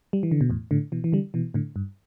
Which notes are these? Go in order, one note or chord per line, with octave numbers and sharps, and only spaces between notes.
G3
E3
D3
B2
E2 A2
A2 D3
B2 E3
E3
D3 G3
B2 E3
A2 D3
G2